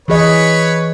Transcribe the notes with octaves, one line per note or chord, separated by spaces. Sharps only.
E3 G#4 B4 C#5 D#5